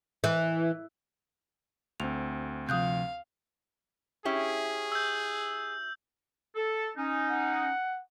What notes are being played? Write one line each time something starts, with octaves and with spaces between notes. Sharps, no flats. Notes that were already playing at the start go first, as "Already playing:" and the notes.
E3
D2 C4 F7
C3 F3 F5 D#6 F#6 G6
C#4 E4 G4 G#4
E6 G6
A4
C#4 D#4
F#5